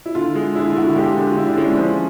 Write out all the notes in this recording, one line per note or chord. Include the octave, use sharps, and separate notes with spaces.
E4
D3 F4
G#3
D3 E4
F4
D3 F#4
F#4
G#3 G4
G4
D3
F4
D3 E4
D4
G#3 C#4
C4
F3 C#4